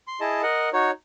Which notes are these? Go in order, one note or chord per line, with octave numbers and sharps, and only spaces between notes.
C6
E4 G#4 D#5 A5
A#4 D#5 F#5
D#4 F#4 C#5